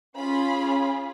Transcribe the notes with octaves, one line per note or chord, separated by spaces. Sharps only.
C#4 F4 G#4 B5